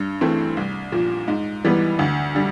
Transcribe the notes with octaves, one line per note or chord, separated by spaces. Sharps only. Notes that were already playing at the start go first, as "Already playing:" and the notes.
Already playing: G2
E3 A3 C4
C2
A#2 F3
G#2
E3 G3 B3
D2
D3 G3